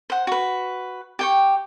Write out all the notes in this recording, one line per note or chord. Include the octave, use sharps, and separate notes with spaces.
C5 F#5
F#4 B4
G4 G5 C#6